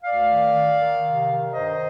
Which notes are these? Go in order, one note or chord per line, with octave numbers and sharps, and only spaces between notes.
D2 D5 F5
D#3
D#3
D#3
C3
D#3
G2 C5 D#5